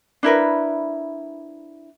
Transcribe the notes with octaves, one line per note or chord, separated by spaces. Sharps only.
D4 E4 A#4 B4